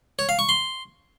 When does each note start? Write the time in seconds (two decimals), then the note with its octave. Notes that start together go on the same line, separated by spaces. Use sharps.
0.19 C#5
0.29 F5
0.39 C#6
0.49 C6